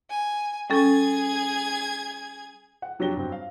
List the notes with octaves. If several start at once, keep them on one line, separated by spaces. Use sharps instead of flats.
G#5
G3 C#4 G#4 A4 G#6
F#5
F2 F#3 D4 G4 A#6 G7
G2 F#3 C4
F5